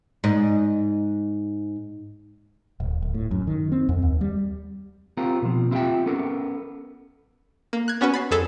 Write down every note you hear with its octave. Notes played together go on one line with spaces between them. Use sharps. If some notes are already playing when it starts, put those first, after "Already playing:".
G#2 D#5
D1
D1
A2
F#2
D#3
C4
F2
D#2
G3
C4 F4 G4 A#4
B2 F3
C4 E4 F4 G4 E5 G5
B3 C#4 A4 A#4
A#3
F#6 G#6
B3 C#4 F#4 B4
B5 A6 C7
F2 G#4 A4 B6